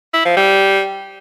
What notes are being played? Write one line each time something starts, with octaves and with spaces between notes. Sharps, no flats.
E4
F3
G3